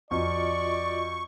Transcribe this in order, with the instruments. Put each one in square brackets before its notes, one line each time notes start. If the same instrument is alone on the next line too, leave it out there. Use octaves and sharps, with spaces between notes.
[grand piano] F2 [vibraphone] F4 F#4 D#5 [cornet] D5 [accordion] C#6